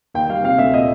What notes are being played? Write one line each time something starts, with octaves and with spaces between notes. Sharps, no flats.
D#2 G5
G3 F5
C3 F5
D2 E5
A#2 D#5